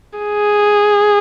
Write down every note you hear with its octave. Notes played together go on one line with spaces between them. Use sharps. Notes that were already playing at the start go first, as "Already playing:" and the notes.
G#4